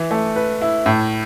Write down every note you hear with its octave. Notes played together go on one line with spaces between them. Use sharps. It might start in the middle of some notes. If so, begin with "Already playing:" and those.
Already playing: E3
A3
B4
E4
A2